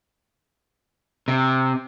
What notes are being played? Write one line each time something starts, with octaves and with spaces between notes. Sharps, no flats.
C3